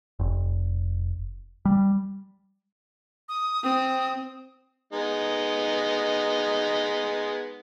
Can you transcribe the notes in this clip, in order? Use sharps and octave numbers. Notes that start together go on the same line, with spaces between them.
F1
G3
D#6
C4 D#6
G#3 B3 D#4